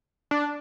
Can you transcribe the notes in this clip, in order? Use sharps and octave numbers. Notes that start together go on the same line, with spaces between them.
D4